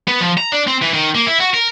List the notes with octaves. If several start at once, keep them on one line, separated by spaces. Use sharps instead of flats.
B3
F3
A#5
D4
C4
E3
D#3
A#3
E4
F#4
A#4